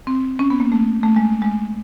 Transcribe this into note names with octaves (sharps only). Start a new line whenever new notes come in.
C4
C#4
B3
A#3
A3
A3
G#3
G#3